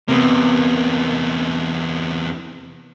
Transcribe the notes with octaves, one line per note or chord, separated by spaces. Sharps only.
E2 C3 A#3 B3